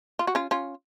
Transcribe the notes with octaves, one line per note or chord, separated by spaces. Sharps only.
F4
F#4
C#4 F4
C#4 F4